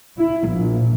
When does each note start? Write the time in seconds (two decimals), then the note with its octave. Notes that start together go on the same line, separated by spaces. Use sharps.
0.19 E4
0.49 A#1